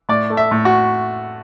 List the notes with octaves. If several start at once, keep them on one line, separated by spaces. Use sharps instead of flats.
A2 D5
A3
E5
A2
F#4